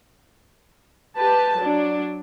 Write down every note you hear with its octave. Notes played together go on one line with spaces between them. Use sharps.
G4 B4 A5
F#3 D4